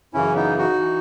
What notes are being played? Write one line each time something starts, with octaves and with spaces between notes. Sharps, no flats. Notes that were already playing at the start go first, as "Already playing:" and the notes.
F#2 C#3 E3 C#4 E4
B3 D#4
D#4 F#4
E3